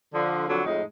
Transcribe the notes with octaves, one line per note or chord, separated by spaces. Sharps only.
D3 F3
F2 D3 F#3
F2 A2 G#3 D#4